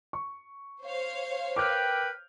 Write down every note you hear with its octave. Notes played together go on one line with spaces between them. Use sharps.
C#6
C5 C#5 F5
A#4 B4 G5 D6 F6 G6